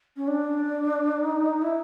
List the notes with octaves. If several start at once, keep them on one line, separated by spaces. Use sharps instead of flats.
C#4
D4
D#4
E4